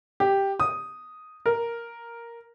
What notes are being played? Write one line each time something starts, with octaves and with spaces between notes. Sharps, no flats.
G4
D#6
A#4